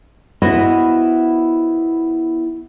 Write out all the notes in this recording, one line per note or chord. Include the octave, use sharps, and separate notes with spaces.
B3 E4 F#4 C5 D#5 E5